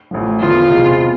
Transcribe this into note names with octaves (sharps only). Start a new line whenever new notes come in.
A1 A2 F3
E2 D3 F3 B3 F4
E1 E2 C3 G#3 C4
B2